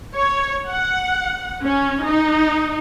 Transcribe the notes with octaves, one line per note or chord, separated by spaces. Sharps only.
C#5
F#5
C#4
D#4